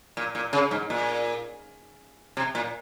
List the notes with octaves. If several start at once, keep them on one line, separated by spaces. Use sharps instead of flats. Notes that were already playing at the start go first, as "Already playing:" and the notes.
A#2
A#2
C#3
G#2
A#2
C3
A#2